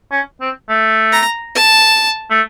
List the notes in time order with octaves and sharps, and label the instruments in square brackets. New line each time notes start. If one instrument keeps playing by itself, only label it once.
[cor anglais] C#4
C4
A3
[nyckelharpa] A#5
A5
[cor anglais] A3